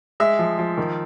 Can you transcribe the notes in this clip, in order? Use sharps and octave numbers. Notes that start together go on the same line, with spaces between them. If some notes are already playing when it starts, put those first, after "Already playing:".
G#3 E5
F3
F3
D#3